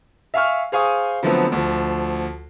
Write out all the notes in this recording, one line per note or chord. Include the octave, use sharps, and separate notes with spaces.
E5 F5 G#5 C#6 F6
G#4 C5 F5 G#5 C#6 D#6
D3 F3 F#3 A3 B3 C4
D2 F3